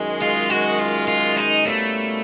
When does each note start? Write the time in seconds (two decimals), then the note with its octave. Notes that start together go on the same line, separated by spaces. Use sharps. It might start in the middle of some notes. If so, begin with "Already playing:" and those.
Already playing: F#2 D#3 G#3
0.22 F4
0.50 F#4
0.79 F4
1.08 F4
1.37 D#4
1.65 B2 G3 A3 A#3 C#4 E4